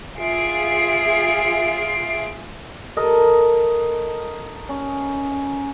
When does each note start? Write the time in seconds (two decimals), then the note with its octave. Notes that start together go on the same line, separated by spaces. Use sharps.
0.19 F4 G#4 E5 C7 D7
2.97 A4 A#4 D#5
4.69 C#4